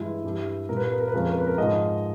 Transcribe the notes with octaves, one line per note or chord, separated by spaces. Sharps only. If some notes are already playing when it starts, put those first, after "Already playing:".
Already playing: G2 E3 G#3 E4
G2 E3 G3
A#2 G3 A#4
B4
A#4
B4
A#4
B4
F2 C#3 F3 G#3 A#4
B4
A#4
B4
A#4
G#2 F3 G#3 D#5